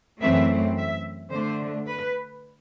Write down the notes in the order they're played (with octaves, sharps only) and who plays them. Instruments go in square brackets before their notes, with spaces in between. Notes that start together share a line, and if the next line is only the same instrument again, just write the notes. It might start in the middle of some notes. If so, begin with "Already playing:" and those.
[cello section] F#2 E3 A3 C4 E5
E5
D3 A3 D4 C5
B4